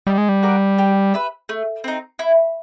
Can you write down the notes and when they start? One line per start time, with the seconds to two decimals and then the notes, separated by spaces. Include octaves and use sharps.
0.07 G3 D#4
0.18 G#3
0.29 G3
0.43 F#4 A#4 D5
0.78 G4
1.14 B4 E5
1.49 A3
1.84 C4 D#4
2.19 E4